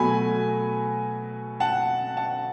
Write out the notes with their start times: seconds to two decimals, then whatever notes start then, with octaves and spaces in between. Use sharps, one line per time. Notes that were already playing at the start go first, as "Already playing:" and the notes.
Already playing: B2 F#3 A3 G#5 B5
1.60 F#5 A5
2.17 F#5 A5